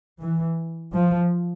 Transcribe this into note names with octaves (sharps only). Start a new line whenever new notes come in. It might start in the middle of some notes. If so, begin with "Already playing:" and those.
E3
F3